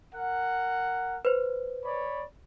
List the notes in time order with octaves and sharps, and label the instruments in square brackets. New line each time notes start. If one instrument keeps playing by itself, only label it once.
[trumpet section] A#4 F#5
[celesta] B4 C5
[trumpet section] C#5 D5 B5